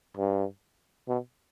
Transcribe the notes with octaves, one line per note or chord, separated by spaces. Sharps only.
G2
B2